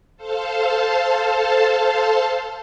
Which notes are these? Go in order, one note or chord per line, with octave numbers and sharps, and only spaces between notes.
A4 C5 F5 A5